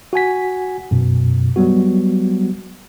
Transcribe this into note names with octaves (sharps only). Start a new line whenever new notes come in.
F#4 F#5 G#5 B6
F#2 B2
F#3 G3 B3 F#4